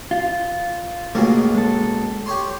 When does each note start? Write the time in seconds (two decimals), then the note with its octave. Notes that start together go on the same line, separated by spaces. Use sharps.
0.11 F4
1.15 C#2 B2 A3 A#3 F4 G#4
1.54 G#3 A4
2.26 G4 C#5 C6